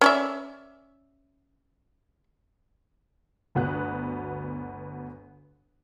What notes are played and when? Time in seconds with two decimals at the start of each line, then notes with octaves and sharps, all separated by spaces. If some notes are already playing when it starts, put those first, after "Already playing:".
0.01 C#4 D5 E5
3.55 G1 D2 B3 F#4 D#6 F#6